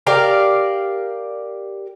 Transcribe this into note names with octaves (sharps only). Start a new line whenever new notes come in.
G4 A#4 D5 F5